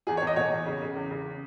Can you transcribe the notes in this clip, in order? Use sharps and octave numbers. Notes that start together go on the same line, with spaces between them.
E2 G#4
C#5
E2
D#5
B2 C#5
E2
C#3
C#3
E2
C#3